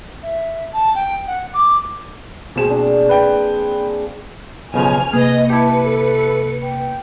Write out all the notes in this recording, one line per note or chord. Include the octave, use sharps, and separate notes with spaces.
E5
A5
G5
F#5
D6
B2 A#3 C4 G#4 E7
D4
B4 G5
B1 C#3 F3 G#5 F6
C3 A#3 G#4 B4 D#5
E4 G4 B4 A5 C#7
A4
G5